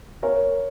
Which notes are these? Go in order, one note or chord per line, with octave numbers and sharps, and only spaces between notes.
A#4 C#5